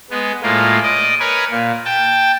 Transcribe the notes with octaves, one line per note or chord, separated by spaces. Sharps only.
G#3 B3
A2 G#3 A#3 F4
D5 D#5
A#4 B4 C#5 G#5
A#2
G5 A5